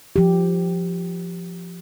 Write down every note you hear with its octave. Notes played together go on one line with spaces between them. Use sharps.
F3 G4